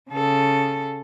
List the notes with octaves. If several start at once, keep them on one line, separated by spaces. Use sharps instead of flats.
C#3 A4